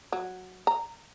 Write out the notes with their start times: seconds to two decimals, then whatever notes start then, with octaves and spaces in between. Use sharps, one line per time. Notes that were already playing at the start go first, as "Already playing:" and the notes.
0.12 F#3
0.67 A#5